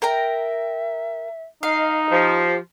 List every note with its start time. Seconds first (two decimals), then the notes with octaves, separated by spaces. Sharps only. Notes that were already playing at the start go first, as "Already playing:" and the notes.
0.02 A#4 E5 G5 A#5
1.63 D#4 D#5 F5
2.10 F3 G4